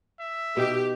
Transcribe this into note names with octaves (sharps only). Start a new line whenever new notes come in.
E5
B2 D#4 G4